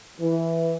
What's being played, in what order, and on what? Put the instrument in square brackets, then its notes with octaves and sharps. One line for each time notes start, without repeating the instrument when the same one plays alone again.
[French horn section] E3